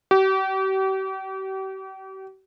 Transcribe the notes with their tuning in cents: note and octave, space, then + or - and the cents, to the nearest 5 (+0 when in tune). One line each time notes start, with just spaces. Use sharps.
G4 -40